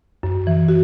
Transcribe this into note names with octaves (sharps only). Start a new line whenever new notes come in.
F#2
E3
F#4